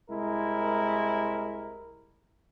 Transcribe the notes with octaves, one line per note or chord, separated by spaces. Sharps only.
C2 G#3 E4 A#4